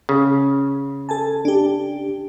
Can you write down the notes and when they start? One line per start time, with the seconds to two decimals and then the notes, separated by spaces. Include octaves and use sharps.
0.09 C#3
1.09 A4 G#5 A5
1.45 D4 G4